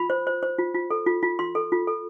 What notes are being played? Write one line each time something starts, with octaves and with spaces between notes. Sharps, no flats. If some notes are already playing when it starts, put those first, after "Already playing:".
Already playing: F4 B5
C5
C5
C5
F4
F4
A4
F4
F4
F4 C6
A4
F4
A4